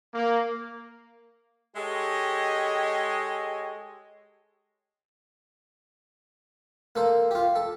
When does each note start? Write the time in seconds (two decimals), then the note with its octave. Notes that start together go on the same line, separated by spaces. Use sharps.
0.14 A#3
1.76 G#3 G4 A4 C#5 D#5
6.96 A#3 A4 C5
7.31 F4 G4
7.56 A4